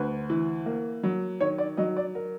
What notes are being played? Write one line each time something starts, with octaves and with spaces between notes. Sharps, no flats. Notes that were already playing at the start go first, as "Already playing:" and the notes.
Already playing: D2 B4
E3
A#3
F#3
D#3 C#5
D5
F#3 D#5
D5
A#4